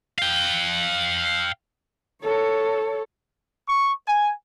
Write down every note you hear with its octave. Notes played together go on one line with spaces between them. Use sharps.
F5 G5
A4 C#5
C#6
G#5